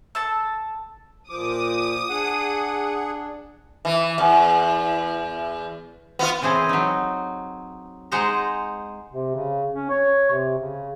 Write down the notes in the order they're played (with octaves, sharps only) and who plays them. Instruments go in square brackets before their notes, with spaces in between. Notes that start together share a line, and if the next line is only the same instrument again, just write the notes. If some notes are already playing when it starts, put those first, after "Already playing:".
[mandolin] A4 A5 E6
[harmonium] A#2 [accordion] F3 D6 [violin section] D#6
[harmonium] D4 [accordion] G#4 F#5
[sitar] E3
E2
B3 F4
[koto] C#3 E3 C4 G#4 A4
F#3 D#4
G#3 D#4 C5 F#5 A#5
[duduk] C3
C#3
C#4
C#5
C3
C#3